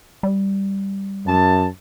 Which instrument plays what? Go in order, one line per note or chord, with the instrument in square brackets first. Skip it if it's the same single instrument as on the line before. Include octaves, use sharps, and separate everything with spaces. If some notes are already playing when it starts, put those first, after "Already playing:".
[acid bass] G3
[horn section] F#2 A5